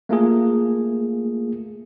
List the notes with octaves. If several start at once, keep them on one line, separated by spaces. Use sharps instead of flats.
A3 A#3 F4 G#4